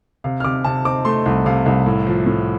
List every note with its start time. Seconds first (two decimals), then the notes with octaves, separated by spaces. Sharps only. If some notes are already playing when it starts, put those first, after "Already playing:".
0.24 C3 F5
0.40 F6
0.44 C3 D6
0.64 C3 A5
0.85 C4 D6
1.05 A3 C6
1.26 C2
1.46 C3 F5
1.66 C2
1.86 A2
2.07 F3
2.26 A2